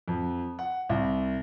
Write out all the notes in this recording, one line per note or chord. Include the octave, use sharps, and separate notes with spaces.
F2
F#5
C2